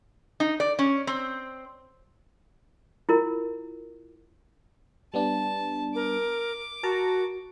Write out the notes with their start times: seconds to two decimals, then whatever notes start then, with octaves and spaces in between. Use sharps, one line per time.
0.40 D#4
0.60 D5
0.79 C#4
1.07 C4
3.09 E4 F4 A#4
5.14 G3 B3 D4 A5
5.95 A#4 D6
6.83 F#4 A#4 A5 A#5